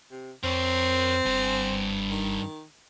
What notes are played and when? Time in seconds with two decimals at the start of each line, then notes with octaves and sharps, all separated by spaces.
0.11 C3
0.44 F2 C4 A#4 C#5
1.26 F#1 G2 G#5
2.10 D#3